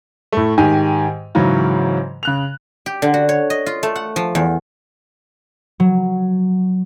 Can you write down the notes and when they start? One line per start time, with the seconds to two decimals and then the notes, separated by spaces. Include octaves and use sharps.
0.32 A2 A3
0.58 G#2 D#3 G4 G#5
1.35 G#2 C#3 E3 F#3 C#4
2.23 C#3 F#6 F7
2.86 G4
3.02 D3
3.14 F#4
3.29 C#5
3.50 D#5
3.66 F4
3.83 A3
3.96 F#5
4.16 F3
4.35 E2
5.80 F#3